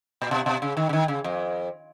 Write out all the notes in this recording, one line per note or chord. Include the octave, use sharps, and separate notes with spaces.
A#2
B2
B2
C#3
D#3
C#3
D#3
C#3
F2